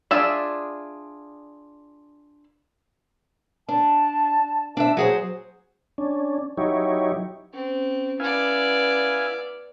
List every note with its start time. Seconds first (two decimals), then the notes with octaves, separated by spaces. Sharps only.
0.11 D4 F4 G#4 D5 E5
3.69 D4 A5
4.77 D4 C5 E5
4.97 F#3 G#4 C5
5.98 C#4 D4
6.57 F#3 D#4 E4 G4 C#5
7.54 C4 C#4
8.20 B3 E4 D5 F5 G#5